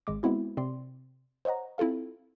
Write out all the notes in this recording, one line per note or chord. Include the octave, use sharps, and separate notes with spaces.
G#1 G#3 D6
G#3 B3 C4 E4 F#4
C3 C4 D5 C6
C5 C#5 D#5 F#5 A#5
C4 E4 F4 A4 F5